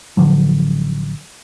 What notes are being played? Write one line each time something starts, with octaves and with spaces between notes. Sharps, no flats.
A1 D3 F3 F#3